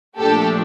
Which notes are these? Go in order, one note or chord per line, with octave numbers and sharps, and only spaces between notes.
A#2 F3 A3 D4 G4 A4